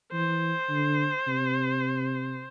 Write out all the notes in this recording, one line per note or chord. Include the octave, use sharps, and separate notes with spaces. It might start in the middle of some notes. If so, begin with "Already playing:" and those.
E3 C5
D3
C3